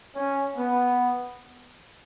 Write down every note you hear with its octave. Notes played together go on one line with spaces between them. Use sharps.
C#4
B3